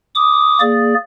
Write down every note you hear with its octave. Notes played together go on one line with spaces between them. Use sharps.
D6 D#6
A#3 G#4 D5